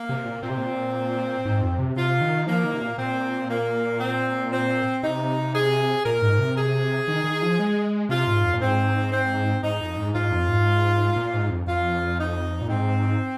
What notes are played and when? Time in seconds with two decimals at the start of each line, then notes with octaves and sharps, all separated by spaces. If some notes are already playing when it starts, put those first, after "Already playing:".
Already playing: A#3
0.09 C3
0.25 A#2
0.43 A#2 C4
0.50 C3
0.58 A#2
1.45 G#2
1.62 F2
1.79 C3
1.96 C3 F4
2.21 D#3
2.47 F3 A#3
2.64 D#3
2.74 C3
2.82 A#2
2.98 A#2 C4
3.49 A#3
4.00 C4
4.51 C4
5.03 C3 D#4
5.54 G#4
6.05 A#2 A#4
6.22 G#2
6.39 C3
6.57 G#4
7.08 D#3
7.24 D#3
7.42 F3
7.59 G#3
8.09 C3 F4
8.27 G#2
8.44 F2
8.53 A#2
8.61 G#2 C4
9.12 C4
9.63 G#2 D#4
9.80 F2
9.97 G#2
10.14 G#2 F4
10.31 F2
10.49 G#2
11.16 A#2
11.34 G#2
11.50 F2
11.67 F2 F4
12.19 D#4
12.61 A#2
12.70 G#2 C4